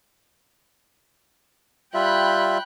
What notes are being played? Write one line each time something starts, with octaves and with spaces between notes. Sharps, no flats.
G3 F4 E5 G5 B5 F#6